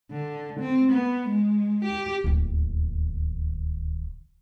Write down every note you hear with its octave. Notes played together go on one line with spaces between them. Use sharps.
D3
C4
B3
G#3
G4
D1 D#2